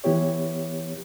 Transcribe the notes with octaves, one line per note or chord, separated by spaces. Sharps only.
E3 B3 E4 G4 C#5